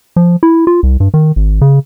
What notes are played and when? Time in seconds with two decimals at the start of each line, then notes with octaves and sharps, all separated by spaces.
0.16 F3
0.43 E4
0.67 F4
0.83 C2
1.00 G2
1.14 D#3
1.36 G#1
1.61 C#3